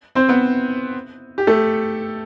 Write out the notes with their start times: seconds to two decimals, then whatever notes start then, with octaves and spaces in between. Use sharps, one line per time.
0.15 C4 C5
0.29 B3 B4
1.38 G4
1.47 A3 A4